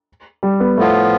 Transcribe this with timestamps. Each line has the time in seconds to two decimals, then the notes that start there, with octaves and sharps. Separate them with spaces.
0.43 G3
0.60 B3
0.77 A2 F3 A3 B3 F4